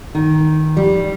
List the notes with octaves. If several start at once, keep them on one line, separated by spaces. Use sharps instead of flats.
D#3
G3